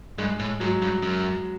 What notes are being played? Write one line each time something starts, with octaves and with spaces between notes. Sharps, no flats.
G2 G#3
A2
G#2 F#3
G2
F#2